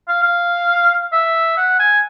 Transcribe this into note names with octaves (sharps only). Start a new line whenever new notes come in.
F5
F5
E5
F#5
G#5